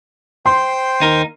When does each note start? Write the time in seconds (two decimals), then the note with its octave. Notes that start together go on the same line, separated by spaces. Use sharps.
0.46 C5 G5 C6
1.00 D#2 D#4 A#4